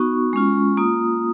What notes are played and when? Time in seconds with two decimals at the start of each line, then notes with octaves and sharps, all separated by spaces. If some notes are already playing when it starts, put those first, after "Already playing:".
Already playing: B3 D#4 F#4 C#6
0.33 G#3 C#4 F4
0.77 A#3 F4 D#6